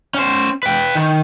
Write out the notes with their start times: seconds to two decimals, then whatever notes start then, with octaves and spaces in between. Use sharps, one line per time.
0.14 C#4 C5
0.63 B4 G5
0.95 D#3